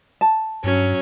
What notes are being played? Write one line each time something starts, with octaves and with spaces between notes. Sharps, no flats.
A5
G2 F#3 C#4